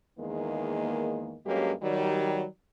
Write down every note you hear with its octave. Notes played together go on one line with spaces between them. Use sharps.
E2 D#3 G#3 A#3
G2 F#3 G#3 A#3 C#4 G4
D#3 F#3 G3